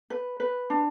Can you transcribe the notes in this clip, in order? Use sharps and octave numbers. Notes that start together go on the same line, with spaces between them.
B4
B4
D4